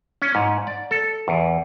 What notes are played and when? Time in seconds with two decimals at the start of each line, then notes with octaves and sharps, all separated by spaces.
0.22 C#4
0.35 G#2
0.67 D5
0.91 A4
1.28 E2